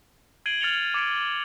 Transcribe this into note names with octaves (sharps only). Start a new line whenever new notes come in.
G#6 C7 D7 D#7 F#7 G7
F6 A6 C#7 F7 G7
D6 G#6 C#7 D7